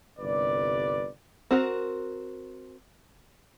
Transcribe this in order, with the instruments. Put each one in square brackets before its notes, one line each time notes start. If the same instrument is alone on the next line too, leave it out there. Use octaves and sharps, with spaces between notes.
[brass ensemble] G1 C2 B4 D5
[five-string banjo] C4 F#4 A#4